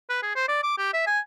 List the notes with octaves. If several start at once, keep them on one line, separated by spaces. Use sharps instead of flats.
B4
G#4
C5
D5
D6
G4
E5
G#5